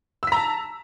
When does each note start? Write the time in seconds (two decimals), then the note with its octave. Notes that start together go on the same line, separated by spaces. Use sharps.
0.23 E6
0.27 B6
0.32 A#5
0.37 A5